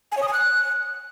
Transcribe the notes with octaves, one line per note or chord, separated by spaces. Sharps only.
G#5
C#5
D#6
G#5
F#6